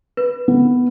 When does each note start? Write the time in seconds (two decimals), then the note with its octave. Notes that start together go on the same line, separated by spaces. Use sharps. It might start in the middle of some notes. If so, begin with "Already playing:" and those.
0.17 B4
0.48 B3